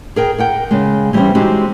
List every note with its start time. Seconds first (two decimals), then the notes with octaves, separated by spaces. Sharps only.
0.16 G#4 A#4 G5
0.38 A#4 F#5 G5
0.71 C#3 G#3
1.13 E3 G3 A#3 C4 C#4
1.35 G#3 C4 D#4 F#4 G4